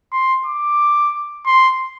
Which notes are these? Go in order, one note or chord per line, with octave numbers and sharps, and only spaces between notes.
C6
D6
C6